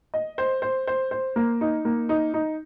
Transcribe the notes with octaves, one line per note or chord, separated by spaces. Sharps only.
D#5
C5
C5
C5
C5
A#3
D#4
A#3
D#4
D#4